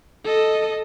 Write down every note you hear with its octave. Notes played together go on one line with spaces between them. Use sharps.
A4 D#5